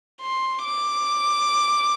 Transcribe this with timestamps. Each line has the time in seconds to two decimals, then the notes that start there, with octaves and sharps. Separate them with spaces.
0.21 C6
0.64 D6